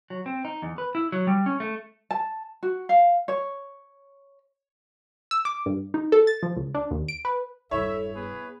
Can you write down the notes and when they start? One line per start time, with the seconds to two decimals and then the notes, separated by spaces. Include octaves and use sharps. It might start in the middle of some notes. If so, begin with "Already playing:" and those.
0.10 F#3
0.26 C4
0.45 D#4
0.62 E2
0.78 B4
0.95 E4
1.12 F#3
1.27 G3
1.46 C#4
1.60 A3
2.11 A5
2.63 F#4
2.89 F5
3.28 C#5
5.31 E6
5.45 D6
5.66 G2
5.94 D#4
6.12 A4
6.27 A6
6.43 F3
6.56 C#2
6.75 D4
6.91 D#2
7.09 D7
7.25 B4
7.71 E1 G2 E4 A4 C#5 E5
8.15 B3 G#4 B4